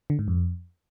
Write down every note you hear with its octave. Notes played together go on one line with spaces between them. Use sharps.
D3
G#2
F2